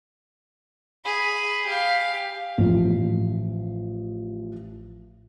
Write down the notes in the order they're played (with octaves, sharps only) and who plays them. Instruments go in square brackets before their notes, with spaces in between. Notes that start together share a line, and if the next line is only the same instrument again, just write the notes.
[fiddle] G#4 B5
G4 F5
[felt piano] A1 F3